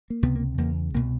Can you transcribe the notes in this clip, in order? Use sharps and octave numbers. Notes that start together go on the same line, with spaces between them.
A#3
C#2 C3 B3
A#3
E2 C#3 A#3
C2 B2 A#3